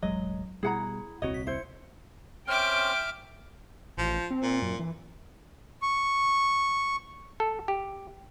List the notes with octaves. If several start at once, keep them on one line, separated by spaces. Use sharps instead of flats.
E1 A1 F#3 G#3 D#5
B2 G3 E4 G#4 F#5 A#5
D#1 C2 C4 F#4 C#5 D#5
B6
E4 C5 C#7
C4 C#4 E5 G5 D6 F6
A1 F3
C4
A#2
F#2
E3
C#6
A4
G4